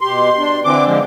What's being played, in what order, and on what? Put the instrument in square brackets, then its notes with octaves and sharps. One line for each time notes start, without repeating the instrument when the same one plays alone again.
[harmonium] B2 G4 [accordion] C6
[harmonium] D4
[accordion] D3 E3 D6 [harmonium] C4 D4
[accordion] D3 F3 G#3